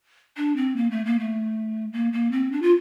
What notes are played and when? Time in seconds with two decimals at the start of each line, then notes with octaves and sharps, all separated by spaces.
0.37 D4
0.56 C4
0.76 A#3
0.91 A3
1.06 A#3
1.19 A3
1.93 A#3
2.13 A#3
2.32 C4
2.52 D4
2.62 F4